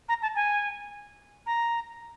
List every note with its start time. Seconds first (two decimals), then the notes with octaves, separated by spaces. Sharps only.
0.09 A#5
0.22 A5
0.36 G#5
1.46 A#5